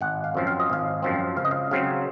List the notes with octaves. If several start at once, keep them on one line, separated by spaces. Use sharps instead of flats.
G#1 F#5
F5
F#2 F3 C4
F5
D#5
G#1 F5
F#2 F3 C4
C#2 F5
D#5
F5
C#3 F#3 C4 F5